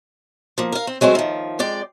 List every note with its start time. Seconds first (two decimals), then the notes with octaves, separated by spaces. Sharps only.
0.58 F3 A#3
0.72 A#4 F5
0.87 C4
1.01 F#3 G#3 A3 C4 C#4
1.15 D#3 F3
1.59 F2 G#3 D5 G5